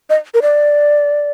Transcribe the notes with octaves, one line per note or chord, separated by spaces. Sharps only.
D#5
A#4
D5